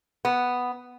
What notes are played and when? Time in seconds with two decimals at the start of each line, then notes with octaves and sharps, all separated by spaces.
0.25 B3